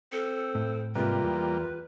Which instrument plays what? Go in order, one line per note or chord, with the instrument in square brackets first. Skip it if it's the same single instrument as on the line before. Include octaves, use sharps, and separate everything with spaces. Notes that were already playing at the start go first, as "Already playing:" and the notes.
[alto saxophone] C4 [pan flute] A4
[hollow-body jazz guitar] A2
[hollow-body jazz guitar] G#2 C3 [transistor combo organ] G3 A#3 [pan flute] F4 [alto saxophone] B4
[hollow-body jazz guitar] E2